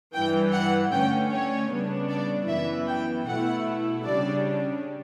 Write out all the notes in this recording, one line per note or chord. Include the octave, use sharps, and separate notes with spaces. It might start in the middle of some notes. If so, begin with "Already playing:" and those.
G2 E3 G3 G5
F#5
D3 A3 C#4 G5
C#5
C#3 G3 B3 D4
D5
F#2 E3 B3 E4 E5
G5
B2 A3 E4 F#5
C#3 G3 D4 D5